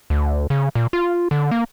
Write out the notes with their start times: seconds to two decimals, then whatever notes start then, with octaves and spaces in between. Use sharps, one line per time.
0.10 D2
0.50 C#3
0.75 A#2
0.93 F4
1.31 D3
1.51 A#3